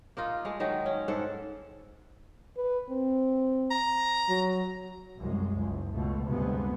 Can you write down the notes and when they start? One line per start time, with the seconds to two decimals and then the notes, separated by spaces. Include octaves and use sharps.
0.17 A#3 D#4 F4
0.45 G#3 A3
0.60 D#3 F#3 G#3 D#4
0.86 C#4
1.08 G#2 A4 F#5
2.57 B4
2.89 C4
3.71 A#5
4.29 F#3
5.19 C2 F#2 G#3
5.57 F#1 C#2
5.93 C#2 B2 A3
6.26 D2 G2 C3 G#3 B3